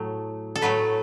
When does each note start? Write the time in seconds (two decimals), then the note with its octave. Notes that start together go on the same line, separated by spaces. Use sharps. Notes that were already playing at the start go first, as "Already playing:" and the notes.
Already playing: A2 F#3 A3
0.56 A4
0.61 A2 F#3 A3 B4